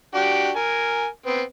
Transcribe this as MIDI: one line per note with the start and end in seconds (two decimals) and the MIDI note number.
0.15 0.50 62
0.15 0.50 66
0.15 0.50 67
0.56 1.07 70
0.56 1.07 80
1.26 1.42 59
1.26 1.42 60